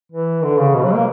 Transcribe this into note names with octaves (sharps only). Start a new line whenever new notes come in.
E3
D3
C#3
B2
F#3
A#3